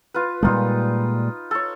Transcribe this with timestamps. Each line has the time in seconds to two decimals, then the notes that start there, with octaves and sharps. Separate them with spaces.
0.14 F4 B4
0.43 A#2 G3 G#3 D#4 F4
1.51 A4 C#5